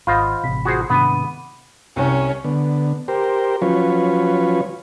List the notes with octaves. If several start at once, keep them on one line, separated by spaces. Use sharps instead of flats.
G#1 F4 C5 D#5 F5 F#5 B5 F6
A1 C3 B6
F4 F#4 G#4 C5
G#2 C3 D#3 B3 D4 B5 D6 D#7
C2 C#4 C#5
D3 B3
G4 A#4 C5
F3 F#3 C#4 F4 B4 C#5